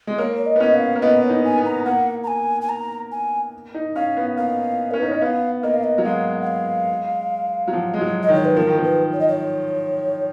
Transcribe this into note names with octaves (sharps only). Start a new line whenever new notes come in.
G#3
A#3 C#5
C#5
D#5
B3
C#4 D#5
F5
A#3
B3 D#5
C#5
D#4
G#5
B3
A#5
A#3 F#5
A#5
G#5
G#5
A#5
G#5
D#4
C#4 F5
B3
A#3 F5
C#4 A#4
B4
D#4
C#5
C#4 D#5
B3 F5
A#3 D#5
F5
D#5
F#3
G#3 F5
F#5
F5
F#3
F3
G#3
F#3
D#5
D#3 C#5
B4
F3 A#4
D#3
F3
B4
C#5
D#5
C#5